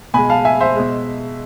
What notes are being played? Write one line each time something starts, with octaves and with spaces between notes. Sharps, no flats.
B2 G#3 G#5 B5
F5 A5
E5 G#5
C5 E5
B2 G#3